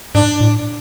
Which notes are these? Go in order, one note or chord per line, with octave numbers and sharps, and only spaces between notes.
G#2 D4
A2